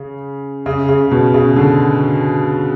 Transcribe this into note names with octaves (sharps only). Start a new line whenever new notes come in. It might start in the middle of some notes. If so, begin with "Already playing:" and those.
Already playing: C#3
C#3
C#3
B2
C#3
D3